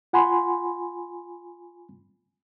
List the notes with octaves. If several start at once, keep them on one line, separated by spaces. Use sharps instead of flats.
F4 F#5 G#5 B5 C6